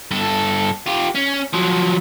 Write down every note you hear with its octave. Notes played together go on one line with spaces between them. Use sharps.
G2 A4
F4 G4
C#4
F3 F#3